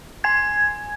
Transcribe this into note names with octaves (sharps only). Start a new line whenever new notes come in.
G#5 G#6